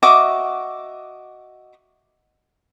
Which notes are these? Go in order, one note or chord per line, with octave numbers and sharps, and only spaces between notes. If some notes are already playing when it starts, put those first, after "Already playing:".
F#4 D#5 E5 D6